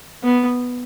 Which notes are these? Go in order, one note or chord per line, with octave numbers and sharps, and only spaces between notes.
B3